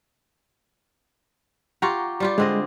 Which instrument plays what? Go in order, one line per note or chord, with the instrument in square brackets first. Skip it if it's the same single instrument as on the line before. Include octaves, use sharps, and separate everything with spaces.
[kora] F4 G4 [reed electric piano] F#5 A#5 C#6
[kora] G3 F4 G4
[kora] D3 C4 D#5 [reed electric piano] G#3